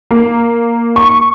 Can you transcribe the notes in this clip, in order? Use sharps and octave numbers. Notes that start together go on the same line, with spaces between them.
A#3
C#6